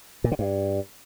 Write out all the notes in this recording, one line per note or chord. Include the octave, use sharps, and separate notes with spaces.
A#2
D3
G2